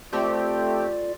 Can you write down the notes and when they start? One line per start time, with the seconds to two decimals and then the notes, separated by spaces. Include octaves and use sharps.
0.13 A3 C4 F4 G4 D5